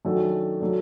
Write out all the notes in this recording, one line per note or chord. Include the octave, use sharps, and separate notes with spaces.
F#2 D#3 A3 D4 F#4
F#3 A3 D4